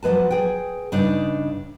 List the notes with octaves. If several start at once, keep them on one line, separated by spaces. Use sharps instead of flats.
F3 F#3 G#3 B4 A5
G#4 G5
G2 C#3 D4 D#4 D5